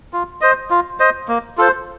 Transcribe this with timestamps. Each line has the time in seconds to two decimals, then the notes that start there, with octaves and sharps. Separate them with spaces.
0.13 F4
0.41 C5 D#5
0.70 F4
1.00 C5 D#5
1.28 A#3
1.58 F4 A4 C5